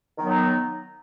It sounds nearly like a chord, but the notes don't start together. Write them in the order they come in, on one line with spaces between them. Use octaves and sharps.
D#3 B3 F#3 D#4